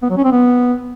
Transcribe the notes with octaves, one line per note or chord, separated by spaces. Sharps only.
B3
F#3
C#4
C4
B3